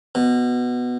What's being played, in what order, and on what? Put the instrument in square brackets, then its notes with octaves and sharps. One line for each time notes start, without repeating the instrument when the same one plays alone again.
[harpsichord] B2